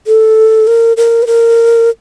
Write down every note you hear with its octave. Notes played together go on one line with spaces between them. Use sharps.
A4
A#4
A#4
B4
A#4